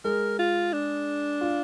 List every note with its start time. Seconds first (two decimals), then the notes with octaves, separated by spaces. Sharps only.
0.04 G#3 A#4
0.39 F4
0.73 D4
1.41 F4